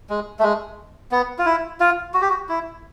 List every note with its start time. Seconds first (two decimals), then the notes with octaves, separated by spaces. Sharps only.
0.10 G#3
0.39 A3
0.43 G#3
1.11 B3
1.38 F4
1.46 E4
1.80 F4
2.14 F#4
2.21 G4
2.30 F#4
2.49 E4